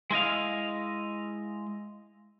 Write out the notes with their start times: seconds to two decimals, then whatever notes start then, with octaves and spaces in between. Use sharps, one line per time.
0.11 G#3 E4 D#5 F5